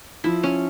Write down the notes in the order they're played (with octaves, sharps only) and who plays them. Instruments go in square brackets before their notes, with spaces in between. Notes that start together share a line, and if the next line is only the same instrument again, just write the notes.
[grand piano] F3 [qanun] E4
[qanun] C#4